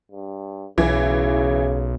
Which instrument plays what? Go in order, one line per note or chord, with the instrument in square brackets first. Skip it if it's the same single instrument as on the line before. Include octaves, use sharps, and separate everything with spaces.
[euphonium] G2
[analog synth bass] B1 [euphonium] C#3 [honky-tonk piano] E3